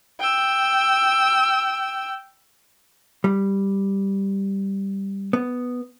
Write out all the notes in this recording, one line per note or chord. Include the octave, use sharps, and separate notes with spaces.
G5 E6
G3
B3